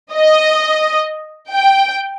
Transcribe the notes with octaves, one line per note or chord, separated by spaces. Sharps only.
D#5
G5